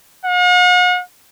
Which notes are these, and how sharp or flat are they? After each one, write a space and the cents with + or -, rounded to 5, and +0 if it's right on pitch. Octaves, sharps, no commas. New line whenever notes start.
F#5 -45